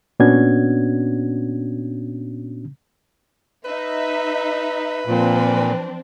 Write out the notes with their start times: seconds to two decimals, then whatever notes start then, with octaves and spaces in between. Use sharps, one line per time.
0.20 A#2 B3 C#4 D4 F#4 G#6
3.65 D#4 B4 E5
5.07 A#2 F3 C4 D4